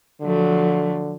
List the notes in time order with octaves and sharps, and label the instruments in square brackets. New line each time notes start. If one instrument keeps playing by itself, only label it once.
[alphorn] D3 [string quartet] F3 F#3 A3